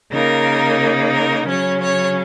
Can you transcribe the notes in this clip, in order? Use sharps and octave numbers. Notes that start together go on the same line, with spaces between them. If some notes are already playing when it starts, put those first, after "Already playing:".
C#3 A#3 D#4 A#4
A#4
C#3 F#3 C#4 C#5
C#5